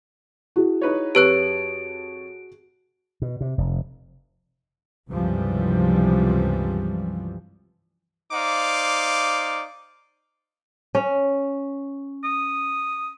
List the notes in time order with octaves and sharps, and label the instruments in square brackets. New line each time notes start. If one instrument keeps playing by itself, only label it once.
[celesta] E4 [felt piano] F#4 G#4
[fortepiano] D#4 B4 C#5
[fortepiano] F2 C#5 [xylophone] G4 B4 F#6 [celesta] D7
[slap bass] B2
C3
F1
[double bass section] C#2 G2 C3 E3 F3 G3
[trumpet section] D#4 C5 D5 F5 D6
[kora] C#4
[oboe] D#6